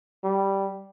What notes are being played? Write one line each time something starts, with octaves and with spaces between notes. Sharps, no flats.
G3